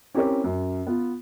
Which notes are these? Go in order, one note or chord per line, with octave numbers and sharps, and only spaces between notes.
C4 C#4 E4 G4 A#4 C#5
F#2
B3 F4